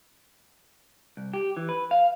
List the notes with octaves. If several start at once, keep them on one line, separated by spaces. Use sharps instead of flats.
C2
G4
E3
B4
F5